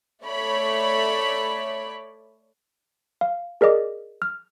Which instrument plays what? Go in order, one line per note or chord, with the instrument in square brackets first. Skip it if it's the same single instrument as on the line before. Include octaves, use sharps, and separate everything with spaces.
[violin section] A3 C#5 D5 B5
[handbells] F5
G#4 A#4 D5 D#5 D6
F6